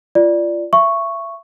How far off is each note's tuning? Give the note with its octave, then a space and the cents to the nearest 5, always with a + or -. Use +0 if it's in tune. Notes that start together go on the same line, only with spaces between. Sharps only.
F4 -25 D5 +0
E5 +30 C#6 +0